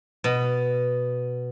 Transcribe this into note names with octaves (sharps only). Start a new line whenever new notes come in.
B2